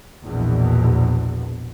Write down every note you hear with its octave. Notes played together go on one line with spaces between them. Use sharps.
A#1 E2 B2